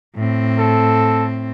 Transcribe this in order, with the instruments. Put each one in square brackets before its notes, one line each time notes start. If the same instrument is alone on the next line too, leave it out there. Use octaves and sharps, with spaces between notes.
[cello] A2 C4
[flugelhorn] A4